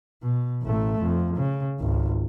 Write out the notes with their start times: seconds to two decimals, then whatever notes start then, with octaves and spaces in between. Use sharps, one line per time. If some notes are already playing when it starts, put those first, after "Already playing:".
0.23 B2
0.63 A1 A3
1.02 F2
1.37 C#3
1.80 G#1 C#2